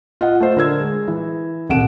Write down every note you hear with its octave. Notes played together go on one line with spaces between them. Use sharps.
F4 D#5 F#5
A3 F4 C5
D3 A#4 E6 G#6
G#3
E3
D#1 C2 F#5 D7 E7